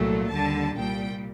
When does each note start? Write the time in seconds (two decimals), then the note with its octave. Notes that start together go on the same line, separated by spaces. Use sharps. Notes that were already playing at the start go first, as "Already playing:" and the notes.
Already playing: C2 A#2 F#3 A3
0.31 D#2 D3 G3 A5
0.76 C2 A#2 G3 G5